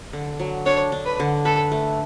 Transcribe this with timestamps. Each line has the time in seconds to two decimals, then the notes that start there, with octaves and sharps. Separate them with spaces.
0.13 D3
0.39 F#3
0.66 D4 C#5
0.92 D4
1.05 B4
1.20 D3
1.45 A4 B4
1.72 A3